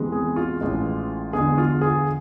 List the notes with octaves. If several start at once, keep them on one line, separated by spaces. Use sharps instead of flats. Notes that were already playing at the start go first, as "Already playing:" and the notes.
Already playing: E2 C3 E3 G#3
G#4
F4
A1 A2 G#3
E2 D3 G#3 G#4
F4
G#4